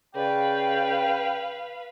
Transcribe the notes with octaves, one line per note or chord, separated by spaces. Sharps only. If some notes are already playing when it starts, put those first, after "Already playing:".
C#3 B4 D5 F5 G5